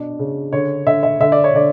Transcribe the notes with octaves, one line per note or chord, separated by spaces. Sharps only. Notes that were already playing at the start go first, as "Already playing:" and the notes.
Already playing: B2 D4
C#3
D3 C#5
D3 E5
E5
D3 E5
D5
C#5
D3 D5